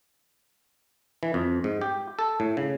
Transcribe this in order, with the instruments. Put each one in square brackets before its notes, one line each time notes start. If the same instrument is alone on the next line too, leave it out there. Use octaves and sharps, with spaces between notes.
[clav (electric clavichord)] E3
F2
G#2
G4
A4
A2
C#3